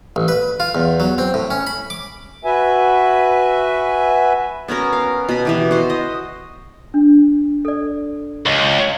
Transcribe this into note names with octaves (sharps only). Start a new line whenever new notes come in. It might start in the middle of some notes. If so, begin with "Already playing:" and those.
A1
B4
F4
E2
F#3
C4
A2
C#4
B5
D6
F#4 B4 E5 G#5
B3 C#4 F#4 A#4
F5
B2 B5
B2 E3 G4
F#4 C5
D#5
D4
A4 D5
C#2